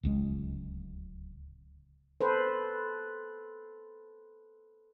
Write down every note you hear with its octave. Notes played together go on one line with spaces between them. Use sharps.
D1 C#2 G#3
A4 B4 C5